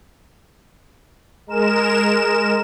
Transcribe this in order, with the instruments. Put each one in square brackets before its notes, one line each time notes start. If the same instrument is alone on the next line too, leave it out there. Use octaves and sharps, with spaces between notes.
[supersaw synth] G#3 A#4 E7